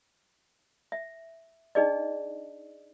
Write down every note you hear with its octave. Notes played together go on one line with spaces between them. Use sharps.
E5
D4 D#4 G#4 D5 D#5